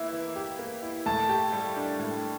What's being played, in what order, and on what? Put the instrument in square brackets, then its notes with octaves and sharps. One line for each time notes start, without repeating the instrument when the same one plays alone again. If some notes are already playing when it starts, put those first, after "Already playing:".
Already playing: [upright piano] E3 A#3 E4 [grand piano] E5
[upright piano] E3
G4
A#3
E4
[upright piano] A2 [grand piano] A5
[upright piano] G4
G3
D4
A2